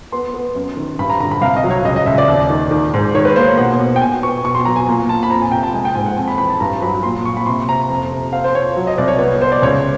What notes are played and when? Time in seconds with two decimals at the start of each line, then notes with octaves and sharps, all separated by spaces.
0.12 B3 C6
0.34 B3
0.55 F#2
0.77 D#3
0.99 G2 B5
1.10 A#5
1.20 D3 A#5
1.31 B5
1.41 C2 F5
1.57 D#5
1.64 F#3
1.70 C#5
1.85 C#2 D#5
1.96 D#5
2.06 C#2 E5
2.18 D5
2.28 D#2
2.50 D#3
2.71 D#3
2.94 G#2
3.14 D#3 C#5
3.25 B4
3.36 A#3 C5
3.48 C#5
3.57 B2 F#5
3.80 B2
3.96 G5
4.01 B2 G#5
4.23 B3 C#6
4.44 B2 C#6
4.55 C6
4.65 F#3 A#5
4.76 G#5
4.87 A#2 G#5
5.09 A#2 A5
5.23 B5
5.30 F2 A#5
5.41 G#5
5.52 C3 G5
5.63 A5
5.74 G#3 G#5
5.85 G5
5.95 G#2 G#5
6.06 F#5
6.17 F2 G#5
6.28 B5
6.38 E3 B5
6.50 A5
6.60 G2 A#5
6.82 F#3 B5
7.03 A#2 C6
7.25 A#2 C#6
7.37 B5
7.46 C3 C6
7.68 C3 A#5
7.90 F2
8.12 C3
8.33 C4 F5
8.44 C5
8.55 C4 C#5
8.76 F#3
8.87 D#5
8.98 C2 D5
9.08 C#5
9.19 B3 C#5
9.41 B3 C5
9.52 D5
9.62 C#2 C#5